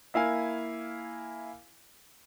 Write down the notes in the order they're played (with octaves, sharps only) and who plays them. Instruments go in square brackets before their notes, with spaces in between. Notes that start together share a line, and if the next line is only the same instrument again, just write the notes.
[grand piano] A#3 E4 F5 G#5